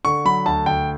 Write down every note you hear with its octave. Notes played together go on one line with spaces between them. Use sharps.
D3 C#6
F#3 B5
D2 A5
D2 G5